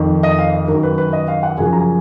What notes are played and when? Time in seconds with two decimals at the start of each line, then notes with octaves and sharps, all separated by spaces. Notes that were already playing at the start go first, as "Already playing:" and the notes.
Already playing: F2 D#3
0.23 D#5
0.39 F5
0.53 D#5
0.68 F#2 D#3 A#4
0.83 B4
0.98 B4
1.13 D#5
1.28 F5
1.43 F#5
1.58 F#2 C#3 F3 G#5
1.73 A#5
1.80 G#5